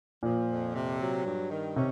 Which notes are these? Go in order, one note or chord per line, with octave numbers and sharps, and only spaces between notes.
A#2 F3
F2
C3
F#3
G2
D#3
C3 C#4